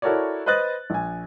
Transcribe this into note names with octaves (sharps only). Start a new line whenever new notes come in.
E4 F#4 A4 A#4 C#5 D5
B4 C5 D#5 F#6 A6
A#1 G#5